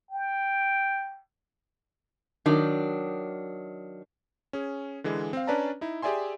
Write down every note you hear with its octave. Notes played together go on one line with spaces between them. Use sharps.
G5
D#3 F#3 D4
C#4 G#4
D3 E3 G#3
C4 F5
C#4 D4 B4 D5 A5 A#5
D#4 E4
G4 G#4 D5 E5 G#5 C6